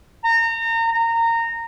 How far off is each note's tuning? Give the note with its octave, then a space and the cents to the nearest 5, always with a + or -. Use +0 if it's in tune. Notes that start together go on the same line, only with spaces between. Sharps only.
A#5 -30
A#5 -20